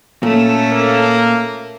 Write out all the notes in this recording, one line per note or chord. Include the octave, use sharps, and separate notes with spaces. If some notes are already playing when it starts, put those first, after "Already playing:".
A#2 A3 C#4 A4
A#3